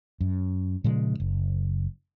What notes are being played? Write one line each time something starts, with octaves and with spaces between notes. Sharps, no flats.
F#2
A#2 C#3 F3 G#3
F#1